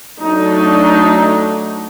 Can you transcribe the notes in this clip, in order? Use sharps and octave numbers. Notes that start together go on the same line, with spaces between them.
F#3 A3 D4 D#4